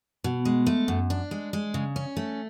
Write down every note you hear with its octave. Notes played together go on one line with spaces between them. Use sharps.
B2
G#3
A3
F#2
D4
G#3
G#3
C#3
C#4
A3